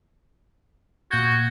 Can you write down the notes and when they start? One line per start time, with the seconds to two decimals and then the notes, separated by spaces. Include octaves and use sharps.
1.11 A#2 F#4 G6 G#6